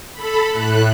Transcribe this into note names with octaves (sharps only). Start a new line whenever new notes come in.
A4 B5
A2 F#6